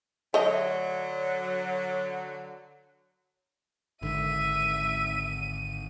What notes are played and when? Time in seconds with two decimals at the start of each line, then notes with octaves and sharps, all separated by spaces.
0.34 D3 F#3 A3 D#5
4.02 G#1 G#2 D3 D#3 E5 D#7